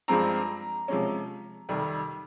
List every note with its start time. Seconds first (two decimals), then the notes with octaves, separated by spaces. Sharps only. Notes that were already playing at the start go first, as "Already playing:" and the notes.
0.08 G2 F3 G#3 C4 A#5
0.88 C3 F3 G#3 C#4
1.69 F2 C3 D#3 G3